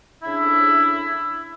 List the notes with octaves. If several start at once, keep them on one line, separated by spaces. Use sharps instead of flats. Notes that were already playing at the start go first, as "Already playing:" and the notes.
C#3 D4 E4
F2
C#3